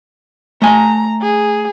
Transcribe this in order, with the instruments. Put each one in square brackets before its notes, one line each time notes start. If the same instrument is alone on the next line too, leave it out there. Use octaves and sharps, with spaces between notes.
[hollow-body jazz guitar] A3 G#5 [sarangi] A#5
[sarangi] G#4